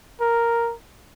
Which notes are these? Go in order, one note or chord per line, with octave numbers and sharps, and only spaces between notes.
A#4